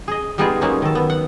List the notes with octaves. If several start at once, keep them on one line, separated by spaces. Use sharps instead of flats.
G#4 D#5
G3 G#3 B3 D#4 F4 G#4
F#3 G#3 A#3 C#4 D#4
D#3 A4
B3
F#5